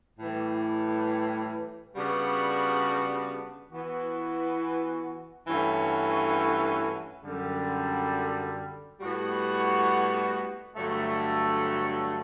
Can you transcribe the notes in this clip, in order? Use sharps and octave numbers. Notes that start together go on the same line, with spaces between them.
A2 E3 G3
C#3 G3 B3 D4 F#4
E3 B3 F#4
G2 E3 A3 C#4 F#4
F#2 D3 G3
A2 G3 B3 F#4
G2 D3 F#3 A3